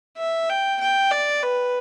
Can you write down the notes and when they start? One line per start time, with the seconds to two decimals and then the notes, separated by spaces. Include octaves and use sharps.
0.17 E5
0.49 G5
0.81 G5
1.11 D5
1.43 B4